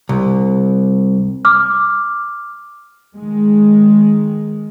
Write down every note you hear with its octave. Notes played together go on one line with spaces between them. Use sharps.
C2
D6 F6
D#3 G#3